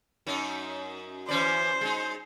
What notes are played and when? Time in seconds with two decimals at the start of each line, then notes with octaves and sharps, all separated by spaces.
0.27 F#2 F#3 D#4
1.28 E3 C#4 C5 D5
1.81 G#3 D#4